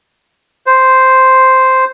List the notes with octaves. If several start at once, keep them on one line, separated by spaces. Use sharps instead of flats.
C5